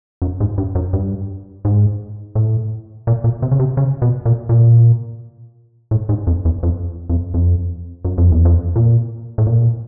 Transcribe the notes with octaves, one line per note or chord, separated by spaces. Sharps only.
F#2
G#2
G2
F#2
G2
G#2
A2
A#2
A#2
C3
C#3
C3
C#3
B2
A#2
A#2
A2
G#2
F2
E2
F2
F2
F2
F#2
F2
E2
F2
A#2
A2
A#2